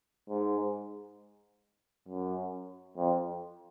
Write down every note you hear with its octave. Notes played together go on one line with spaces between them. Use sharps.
G#2
F#2
F2